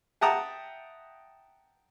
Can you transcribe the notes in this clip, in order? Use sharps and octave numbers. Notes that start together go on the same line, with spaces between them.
E5 F#5 G5 A5 A#5 D#6